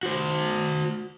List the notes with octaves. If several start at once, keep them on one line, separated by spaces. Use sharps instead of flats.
F#4 C5